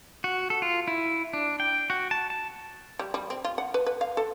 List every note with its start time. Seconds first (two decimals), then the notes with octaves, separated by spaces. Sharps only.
0.24 F#4
0.50 A4
0.62 F4
0.88 E4
1.33 D4
1.60 G5
1.90 F#4
2.11 A5
2.30 A5
2.99 G3
3.14 G3
3.30 C4
3.45 F4
3.58 F#5
3.74 B4
3.86 B4
4.01 F5
4.17 A4